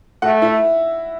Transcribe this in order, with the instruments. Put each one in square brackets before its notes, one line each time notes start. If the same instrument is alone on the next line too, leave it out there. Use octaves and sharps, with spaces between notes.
[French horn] A3 [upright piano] F#4 F#5
[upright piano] E4 E5